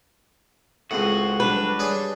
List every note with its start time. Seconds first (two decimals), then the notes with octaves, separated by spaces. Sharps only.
0.91 C#2 A2 G#3 C4 F#4
1.40 F#3 G3 D4 B4
1.79 G3 D4 G#4 C#5